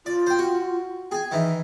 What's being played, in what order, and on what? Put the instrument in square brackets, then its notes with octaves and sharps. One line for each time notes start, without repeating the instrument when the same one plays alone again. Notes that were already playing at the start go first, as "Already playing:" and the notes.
[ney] F4 [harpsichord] D5
[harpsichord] C5 G5
F#4
[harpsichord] G#4 G#5 [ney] G5
[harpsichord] D#3 E3 D#4 [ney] E5